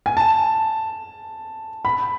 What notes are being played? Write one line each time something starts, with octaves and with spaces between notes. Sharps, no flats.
G#5
A5
B5